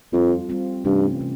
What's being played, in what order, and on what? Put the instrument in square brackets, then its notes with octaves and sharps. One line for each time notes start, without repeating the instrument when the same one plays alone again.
[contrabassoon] F2 [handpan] G3 C4 F4
[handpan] G3 C4 F4
[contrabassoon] G2 [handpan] C3 E3 A3 C#4
[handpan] C3